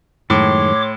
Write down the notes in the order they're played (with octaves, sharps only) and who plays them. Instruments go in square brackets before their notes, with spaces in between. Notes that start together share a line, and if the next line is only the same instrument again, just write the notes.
[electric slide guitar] F#2 D#3 G#3 [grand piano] A2 [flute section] C#5 C6 [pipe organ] D6